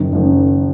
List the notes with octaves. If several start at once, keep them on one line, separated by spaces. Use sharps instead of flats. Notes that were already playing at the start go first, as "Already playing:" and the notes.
Already playing: F#1 F#2 D#3
F#1 F#2 D#3